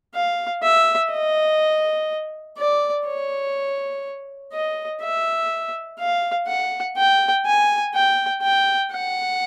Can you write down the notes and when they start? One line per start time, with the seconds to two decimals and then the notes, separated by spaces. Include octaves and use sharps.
0.15 F5
0.63 E5
1.12 D#5
2.58 D5
3.07 C#5
4.53 D#5
5.02 E5
5.99 F5
6.47 F#5
6.97 G5
7.45 G#5
7.94 G5
8.43 G5
8.92 F#5